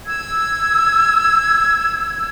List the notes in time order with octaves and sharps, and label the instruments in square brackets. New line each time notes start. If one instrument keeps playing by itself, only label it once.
[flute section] E6 G#6